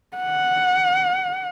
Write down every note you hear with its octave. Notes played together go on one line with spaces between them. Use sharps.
F#5